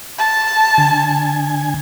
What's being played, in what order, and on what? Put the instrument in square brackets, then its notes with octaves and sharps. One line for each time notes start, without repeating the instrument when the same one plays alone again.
[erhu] A5
[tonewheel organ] D3 G#5